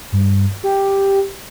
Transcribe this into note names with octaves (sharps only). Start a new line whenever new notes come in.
G2
G4